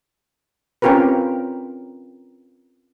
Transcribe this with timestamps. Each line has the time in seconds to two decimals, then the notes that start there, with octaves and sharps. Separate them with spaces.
0.82 C4 C#4 F4 G4 A#4 B4